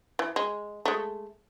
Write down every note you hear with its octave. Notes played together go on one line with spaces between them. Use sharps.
E3
G#3
G#3 A3